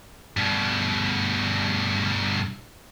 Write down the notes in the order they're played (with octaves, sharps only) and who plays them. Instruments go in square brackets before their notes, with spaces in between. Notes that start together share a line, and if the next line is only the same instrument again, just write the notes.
[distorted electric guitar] G2 B2